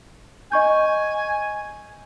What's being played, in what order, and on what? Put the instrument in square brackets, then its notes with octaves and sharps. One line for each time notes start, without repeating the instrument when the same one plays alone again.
[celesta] D#5 C#6 G6 [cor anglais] G#5